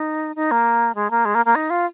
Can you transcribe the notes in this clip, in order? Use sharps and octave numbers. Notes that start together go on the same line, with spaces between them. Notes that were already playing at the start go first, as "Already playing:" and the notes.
Already playing: D#4
D#4
A#3
G#3
A#3
G#3
A#3
A#3
D#4
F4